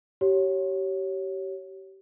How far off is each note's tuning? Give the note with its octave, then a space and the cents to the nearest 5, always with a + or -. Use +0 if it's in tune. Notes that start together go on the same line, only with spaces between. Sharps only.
G4 -30 C#5 +0